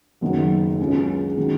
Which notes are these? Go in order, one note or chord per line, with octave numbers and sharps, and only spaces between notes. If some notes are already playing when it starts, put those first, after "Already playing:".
F#1 F#2 D#3 F#3 B3
C#2 C#3 F#3 C#4 G#4
D#3 G#3 C#4 F#4